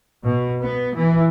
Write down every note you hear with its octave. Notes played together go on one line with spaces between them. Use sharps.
B2
B3
E3